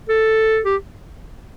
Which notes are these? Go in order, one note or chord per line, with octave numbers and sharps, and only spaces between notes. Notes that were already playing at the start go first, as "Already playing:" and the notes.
A4
G4